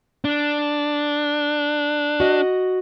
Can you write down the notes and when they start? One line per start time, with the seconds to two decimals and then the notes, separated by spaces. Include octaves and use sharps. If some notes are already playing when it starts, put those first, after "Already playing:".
0.25 D4
2.20 F#4 D#5